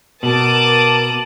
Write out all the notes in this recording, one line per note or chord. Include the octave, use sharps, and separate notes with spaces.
B2 A#4 A5 D6 D#6 F#7